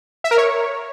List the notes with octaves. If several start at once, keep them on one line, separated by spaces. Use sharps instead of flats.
E5
A#4
C#5